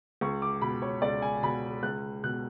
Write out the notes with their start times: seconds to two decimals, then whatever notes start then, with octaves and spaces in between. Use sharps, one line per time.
0.21 C#2 C#6
0.42 D6
0.62 B2 B5
0.82 C#5
1.02 C#2 D5
1.22 G#5
1.42 B2 B5
1.83 C#2 F#6
2.24 B2 F#6